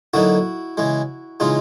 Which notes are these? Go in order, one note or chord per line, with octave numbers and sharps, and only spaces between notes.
D3 F#3 A#3 D#4 E4 F#4
C#3 E3 G#3
C#3 E3 G#3 D#4 F4